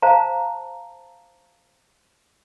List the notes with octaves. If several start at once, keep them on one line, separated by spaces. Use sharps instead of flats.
C5 F5 A5 A#5